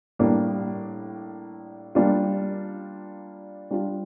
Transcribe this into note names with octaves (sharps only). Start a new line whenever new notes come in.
A2 G3 A#3 D4
G3 A#3 D4 F4
G3 D4 F4